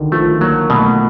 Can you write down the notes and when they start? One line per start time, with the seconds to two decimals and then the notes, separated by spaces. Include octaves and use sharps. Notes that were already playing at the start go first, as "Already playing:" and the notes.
Already playing: D3 D#3
0.12 F3 A3
0.41 F#3 A#3
0.70 B2 A3